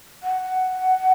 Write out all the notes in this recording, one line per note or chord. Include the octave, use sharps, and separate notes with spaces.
F#5